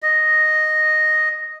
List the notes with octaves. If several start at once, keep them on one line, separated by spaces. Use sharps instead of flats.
D#5